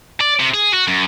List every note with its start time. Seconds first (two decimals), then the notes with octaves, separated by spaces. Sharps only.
0.21 D5
0.39 C3
0.54 G#4
0.73 F#4
0.88 F#2